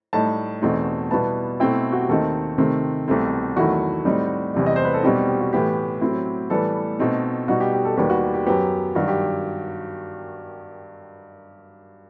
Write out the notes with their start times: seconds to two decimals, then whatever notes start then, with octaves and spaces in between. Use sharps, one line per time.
0.13 A2 G3 D#4 A5
0.62 E2 B2 A3 C4 D#4
1.11 B2 G3 B3 E4 A5
1.60 B2 A3 C4 E4 G5
1.92 F#4
2.00 G4
2.09 D#2 D#3 A3 C4 D#4 A4
2.58 C3 D#3 A3 C4 D#4
3.08 C2 B2 A3 C4
3.56 E2 D#3 F#3 A3 E4 F#4
4.05 A2 G3 C4 D#4
4.54 E2 C3 E3 G3
4.66 D#5
4.76 C5
4.85 B4
4.94 A4
5.03 B2 G3 C4 D#4 G4
5.15 G4
5.28 G4
5.40 F#4
5.53 A2 E3 B3 E4 G4
6.01 A2 F#3 C4 E4
6.50 A2 E3 G3 B3 A4
6.99 B2 A3 C4 D#4
7.48 B2 G3 D#4 F#4
7.60 G4
7.73 G4
7.85 A4
7.97 D#2 D#3 G3 B3 G4
8.10 F#4
8.22 G4
8.34 G4
8.46 F#2 F#3 B3 G4
8.95 G2 D#3 F#3 F#4
9.08 G4